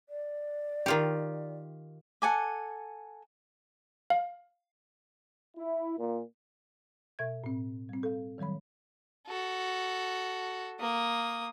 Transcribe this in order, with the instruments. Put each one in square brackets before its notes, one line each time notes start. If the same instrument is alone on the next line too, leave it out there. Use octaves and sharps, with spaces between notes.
[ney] D5
[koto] D#3 F4 G4
[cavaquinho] A4 F#5 G#5 D6
[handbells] F5
[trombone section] E4
A#2
[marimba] B2 E5 G#6
A2 C4
G3 C4
A4 F5
D#3 F#3 G3 C#5 B5
[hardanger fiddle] F#4 A4
A#3 D#6